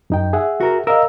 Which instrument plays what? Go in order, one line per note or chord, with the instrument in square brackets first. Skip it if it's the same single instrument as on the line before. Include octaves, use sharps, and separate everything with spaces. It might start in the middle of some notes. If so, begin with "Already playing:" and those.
[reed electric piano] F#2 D#4 G5
G#4 E5 F#5
[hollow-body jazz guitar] F#4 A#4
[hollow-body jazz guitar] A#4 [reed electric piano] D#5 F5 E6